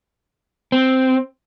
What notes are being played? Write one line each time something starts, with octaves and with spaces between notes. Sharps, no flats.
C4